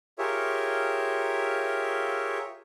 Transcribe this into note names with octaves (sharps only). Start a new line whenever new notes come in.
F4 G4 G#4 A#4 C#5 E5